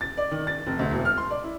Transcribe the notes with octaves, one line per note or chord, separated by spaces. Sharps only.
A6
D5
D#3
A6
F1
D2
E1
F6
C6
D5
E4